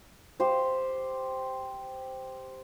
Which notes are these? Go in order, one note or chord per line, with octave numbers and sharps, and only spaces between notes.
G4 C5